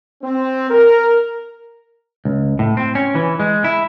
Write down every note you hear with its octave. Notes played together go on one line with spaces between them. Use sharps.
C4
A#4
C#2
A2
C4
C#4
E3
G#3
E4